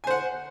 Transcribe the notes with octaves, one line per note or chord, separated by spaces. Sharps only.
C5 F#5 G#5